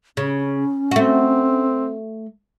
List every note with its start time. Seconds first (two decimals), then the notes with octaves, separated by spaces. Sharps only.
0.17 C#3 C#4
0.91 A3 C4 F#4